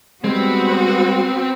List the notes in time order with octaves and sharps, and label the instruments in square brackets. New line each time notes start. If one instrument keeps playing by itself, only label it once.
[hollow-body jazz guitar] G3 G#3 [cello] B3 F#4 [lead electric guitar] C4